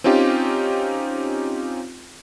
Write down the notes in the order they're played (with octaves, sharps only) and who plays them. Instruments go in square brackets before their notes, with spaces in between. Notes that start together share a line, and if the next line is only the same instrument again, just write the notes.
[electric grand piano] C4 C#4 D#4 F4 G4